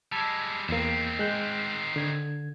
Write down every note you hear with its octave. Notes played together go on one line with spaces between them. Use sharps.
G3 G#3 A5 E6 G#6
E2 D#3 A#3 C4
G#3 F#6 G6
D3 G#6